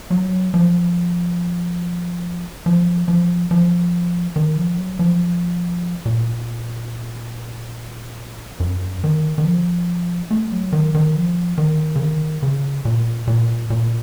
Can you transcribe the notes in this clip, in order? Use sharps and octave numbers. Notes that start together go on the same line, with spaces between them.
F#3
F3
F3
F3
F3
D#3
F3
F#3
F3
A#2
F#2
D#3
D#3
F3
A3
F#3
D#3
D#3
F3
D#3
C#3
D#3
C#3
A#2
A#2
A#2